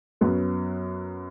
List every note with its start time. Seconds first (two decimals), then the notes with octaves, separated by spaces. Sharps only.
0.21 F#2 F#3 B3